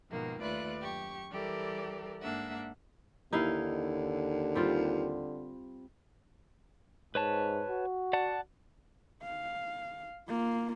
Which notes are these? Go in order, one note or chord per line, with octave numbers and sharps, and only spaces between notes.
G#2 B2 D#3 F3 A#3
D#2 A3 F4 B4 D5 F#6
F#2 G4 C#6
E3 G3 G4 A4 A#4 D5
G#2 A#3 D4 E5 F#5
D#2 D3 D#4 E4 F5
G3 C4 F4
G#2 B4 C#5 A5
F#4
D5 F#5 A5
F5
A#3 F4